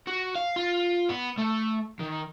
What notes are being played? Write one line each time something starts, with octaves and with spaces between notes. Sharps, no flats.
F#4
F5
F4
B3
A3
D#3